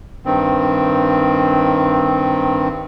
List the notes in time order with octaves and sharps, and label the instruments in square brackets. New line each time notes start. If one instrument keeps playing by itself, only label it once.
[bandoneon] G2 D#3 C4